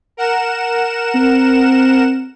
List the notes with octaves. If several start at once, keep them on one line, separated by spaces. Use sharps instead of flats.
A#4 F#5 E7
C4